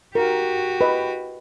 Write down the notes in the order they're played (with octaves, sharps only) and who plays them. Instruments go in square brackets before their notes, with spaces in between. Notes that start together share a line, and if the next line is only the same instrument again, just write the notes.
[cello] F#4 G4 [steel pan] A#4
[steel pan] B4 D#5